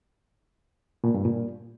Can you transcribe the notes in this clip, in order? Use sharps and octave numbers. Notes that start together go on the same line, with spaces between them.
A#2
G2
A#2